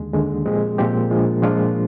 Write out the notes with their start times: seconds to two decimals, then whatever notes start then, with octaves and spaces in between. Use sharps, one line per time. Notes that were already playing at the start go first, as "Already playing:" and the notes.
Already playing: D#2 D3 G#3
0.13 D#2 D3 G#3
0.45 A#2 F3 G#3 C4 G4
0.78 A#2 F3 G#3 C4 G4
1.10 A#2 F3 G#3 D4 F4
1.42 A#2 F3 G#3 D4 F4